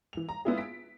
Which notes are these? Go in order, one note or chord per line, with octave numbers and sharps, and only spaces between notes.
E3 F7
A#5
G#3 B3 D4 E4 F4 G#4
B6 D7